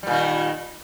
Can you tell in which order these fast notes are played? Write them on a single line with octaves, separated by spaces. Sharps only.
G3 A#2 D#3